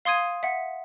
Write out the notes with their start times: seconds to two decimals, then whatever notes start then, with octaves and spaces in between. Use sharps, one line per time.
0.05 F5 C6 D#6 G#6 D#7
0.43 E5 F#5